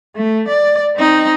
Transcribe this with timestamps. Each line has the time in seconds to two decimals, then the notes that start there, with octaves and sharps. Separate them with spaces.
0.16 A3
0.48 D5
0.97 C4 D#4